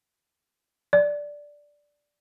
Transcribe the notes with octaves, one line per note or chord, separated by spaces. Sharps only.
D5